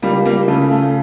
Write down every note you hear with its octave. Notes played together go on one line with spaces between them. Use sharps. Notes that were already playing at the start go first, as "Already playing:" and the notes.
C#2 G3 A#3
G3 A#3
C#3 A3
A3